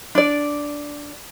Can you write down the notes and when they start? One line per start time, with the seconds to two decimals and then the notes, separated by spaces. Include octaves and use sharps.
0.15 D4 D5